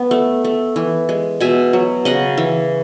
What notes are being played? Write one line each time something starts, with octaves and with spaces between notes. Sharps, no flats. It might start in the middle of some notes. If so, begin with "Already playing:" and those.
Already playing: B3
A3
A3
E3
G#3
B2 E5 G#5
F#3
C#3 D#5 F#5
E3